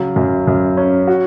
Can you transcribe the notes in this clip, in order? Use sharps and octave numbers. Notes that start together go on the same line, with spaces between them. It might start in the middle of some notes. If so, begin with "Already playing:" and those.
Already playing: C#3 F#3
F#2
F#2
C#4
F#4